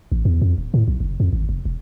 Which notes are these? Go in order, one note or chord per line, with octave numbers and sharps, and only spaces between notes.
A1
E2
F2
D1
A2
B1
F#1
F2
G#1
F1
E1